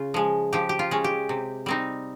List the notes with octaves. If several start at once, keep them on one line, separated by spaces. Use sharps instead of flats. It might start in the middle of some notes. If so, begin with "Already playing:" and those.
Already playing: C#3 F4
F3 G#3
F3 G4
G4
F4
G#3 C#4
G4
C3
G3 C4 D#4